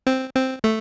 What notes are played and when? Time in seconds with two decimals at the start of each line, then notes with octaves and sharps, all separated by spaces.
0.07 C4
0.35 C4
0.64 A3